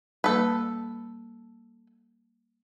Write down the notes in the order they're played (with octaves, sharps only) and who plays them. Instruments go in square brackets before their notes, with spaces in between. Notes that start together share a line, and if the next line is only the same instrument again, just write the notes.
[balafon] G3 A#3 [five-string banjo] A4 B4